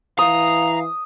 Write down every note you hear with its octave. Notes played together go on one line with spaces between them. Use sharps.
E3 F5 A#5 D#6